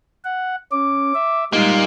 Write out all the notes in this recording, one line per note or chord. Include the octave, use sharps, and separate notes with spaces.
F#5
C#4 D6
E5
G3 G#3 A#3 D#4 F4